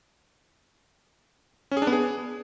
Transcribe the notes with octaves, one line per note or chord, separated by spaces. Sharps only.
C#4
G#4
D4
B3
G#4